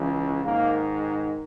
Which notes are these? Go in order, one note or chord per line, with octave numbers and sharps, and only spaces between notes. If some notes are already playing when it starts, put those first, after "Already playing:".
Already playing: C#2 C#3 E3
G#2 D#3 A#3